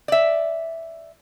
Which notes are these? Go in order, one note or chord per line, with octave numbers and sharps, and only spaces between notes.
D5 E5